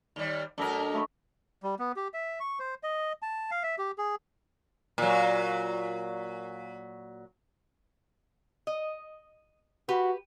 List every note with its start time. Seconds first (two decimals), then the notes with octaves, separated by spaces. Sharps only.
0.16 D#2 G3
0.58 F#2 D4 A4 A#4 D#5
0.93 A3 B5 C#6
1.63 G3
1.79 B3
1.96 G4
2.14 E5
2.40 C#6
2.60 C5
2.83 D#5
3.22 A5
3.51 F5
3.63 E5
3.78 G4
3.98 G#4
4.98 A#2 F#3
8.67 D#5
9.89 F#4 G4 B4